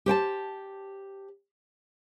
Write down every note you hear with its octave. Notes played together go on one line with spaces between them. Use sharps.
G4 C5 G5 A5